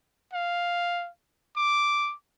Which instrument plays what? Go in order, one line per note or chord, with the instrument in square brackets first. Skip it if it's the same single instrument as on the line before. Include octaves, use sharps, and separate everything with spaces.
[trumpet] F5
D6